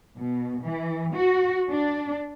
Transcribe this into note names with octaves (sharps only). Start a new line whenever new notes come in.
B2
E3
F#4
D4